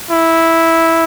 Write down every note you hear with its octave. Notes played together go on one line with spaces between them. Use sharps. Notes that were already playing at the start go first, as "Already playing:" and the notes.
E4